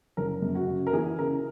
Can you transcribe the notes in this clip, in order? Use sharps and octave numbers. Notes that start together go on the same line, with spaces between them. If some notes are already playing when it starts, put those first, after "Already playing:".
F#1 A#4
F#2
F#4
C#3
A#4
E3 G#4
C#3 A#4